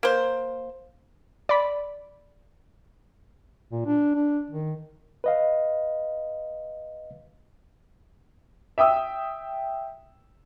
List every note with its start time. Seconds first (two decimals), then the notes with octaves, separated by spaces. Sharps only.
0.03 A#3 C5
1.49 D5 B5
3.71 A#2
3.86 D4
4.15 D4
4.51 D#3
5.24 B4 D#5 F5
8.78 E5 G5 D#6 E6